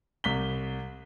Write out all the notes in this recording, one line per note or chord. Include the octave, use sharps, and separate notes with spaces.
C2 B6 G7